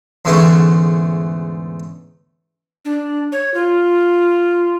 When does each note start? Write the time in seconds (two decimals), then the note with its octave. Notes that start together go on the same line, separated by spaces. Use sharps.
0.25 E2 G#2 D3 E3 A3 C#4
2.85 D4
3.32 C#5
3.54 F4